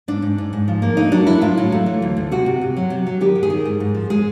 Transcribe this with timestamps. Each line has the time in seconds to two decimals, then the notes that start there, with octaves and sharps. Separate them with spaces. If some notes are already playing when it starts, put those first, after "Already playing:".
0.08 G#2 D4
0.22 G#2
0.38 G#2
0.53 G#2
0.68 F3
0.82 A#3
0.97 A3 D#4
1.12 F#3 D4
1.27 F#3 E4
1.41 A2 F4
1.58 F#3
1.72 A3
1.86 E3
2.02 D2
2.17 D2
2.32 C3 F#4
2.46 C3
2.61 C3
2.77 F#3
2.90 C3
3.06 F#3
3.21 D#3 G4
3.36 D#3
3.43 G#4
3.50 D#3
3.65 G#2
3.80 G#2
3.95 F3
4.10 G#3 G#4